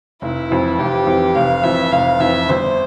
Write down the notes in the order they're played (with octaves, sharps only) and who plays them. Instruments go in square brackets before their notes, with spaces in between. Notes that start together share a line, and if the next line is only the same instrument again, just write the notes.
[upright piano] F1 [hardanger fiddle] E4
[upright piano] F2 E3
[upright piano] F1 [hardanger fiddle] G4
[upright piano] F2 E3
[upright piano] F1 [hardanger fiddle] F5
[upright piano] F2 E3 [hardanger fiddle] E5
[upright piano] F1 [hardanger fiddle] F5
[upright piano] F2 E3 [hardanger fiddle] E5
[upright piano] G1 [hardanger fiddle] C5